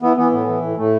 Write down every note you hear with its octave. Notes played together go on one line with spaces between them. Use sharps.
E3 B3
E3 B3
A2 B3
E3
A2
A2 A3